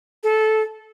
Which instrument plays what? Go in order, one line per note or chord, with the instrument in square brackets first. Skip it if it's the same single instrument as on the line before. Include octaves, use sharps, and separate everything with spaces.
[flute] A4